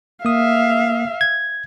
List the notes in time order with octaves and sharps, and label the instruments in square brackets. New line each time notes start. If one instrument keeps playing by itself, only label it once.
[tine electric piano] A#3 D#6 [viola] E5 F5
[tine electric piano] G#6